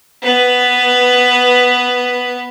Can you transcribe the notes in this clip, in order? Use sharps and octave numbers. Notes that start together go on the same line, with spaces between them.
B3 B4